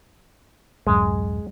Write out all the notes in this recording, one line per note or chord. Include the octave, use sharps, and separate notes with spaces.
D1 F#2 G#3